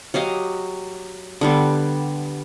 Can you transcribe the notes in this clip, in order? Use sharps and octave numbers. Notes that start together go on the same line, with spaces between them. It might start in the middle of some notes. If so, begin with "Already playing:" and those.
F#3 G4 D#5 F5
D3 G3 B3